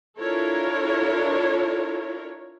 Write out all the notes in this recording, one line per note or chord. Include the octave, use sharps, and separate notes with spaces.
D4 E4 F4 A4 A#4 C#5